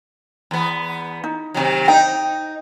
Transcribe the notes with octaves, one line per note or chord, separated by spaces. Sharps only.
E2 B3
D#4
C3 D#3 F#3
D#4 G5